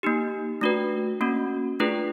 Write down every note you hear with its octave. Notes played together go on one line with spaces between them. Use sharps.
A#3 D#4 G4
A3 D4 F#4 B4
A#3 C#4 F#4
A3 D4 F4 G#4 B4